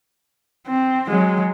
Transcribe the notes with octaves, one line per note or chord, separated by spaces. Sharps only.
C4
F#3 G#3